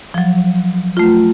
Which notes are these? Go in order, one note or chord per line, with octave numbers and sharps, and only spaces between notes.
F3 F#3
A3 F4